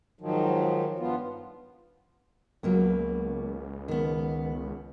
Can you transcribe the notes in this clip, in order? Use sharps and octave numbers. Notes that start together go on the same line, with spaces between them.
G#2 D#3 F3 F#3
G2 F3 B3 F4
C#2 F#3 A#3 B3
D#3 B3